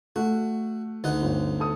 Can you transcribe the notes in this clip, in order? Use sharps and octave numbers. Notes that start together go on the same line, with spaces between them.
A3 F#4
D2 D#4 F#5
G1
A4 D#6